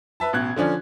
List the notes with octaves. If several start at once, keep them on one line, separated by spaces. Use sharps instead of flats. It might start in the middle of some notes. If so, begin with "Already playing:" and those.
B4 E5 A5
A1 B2 F#6 G#6
D3 F3 C#4 D4